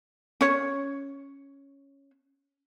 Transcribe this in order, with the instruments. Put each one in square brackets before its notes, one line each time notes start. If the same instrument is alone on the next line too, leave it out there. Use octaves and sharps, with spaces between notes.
[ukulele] C#4 C#5